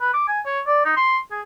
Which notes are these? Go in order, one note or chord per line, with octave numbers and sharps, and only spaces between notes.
B4
D6
G#5
C#5
D5
D#4
C6
G#4